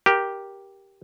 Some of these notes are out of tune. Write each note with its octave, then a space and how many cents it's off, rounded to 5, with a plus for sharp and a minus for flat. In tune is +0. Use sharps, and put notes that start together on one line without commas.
G4 +0 A#4 +15